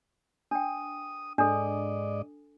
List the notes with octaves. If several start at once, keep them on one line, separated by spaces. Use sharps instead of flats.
D4 G5 D#6
G#2 D4 A4 D5 D#5